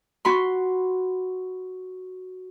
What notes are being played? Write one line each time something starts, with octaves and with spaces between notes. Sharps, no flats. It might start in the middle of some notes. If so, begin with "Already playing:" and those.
F#4 B5 C6